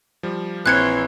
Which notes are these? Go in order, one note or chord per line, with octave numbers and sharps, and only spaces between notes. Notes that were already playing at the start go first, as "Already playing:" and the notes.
F3 G3
A#1 E3 C4 C#5 C6 F#6 G#6 C#7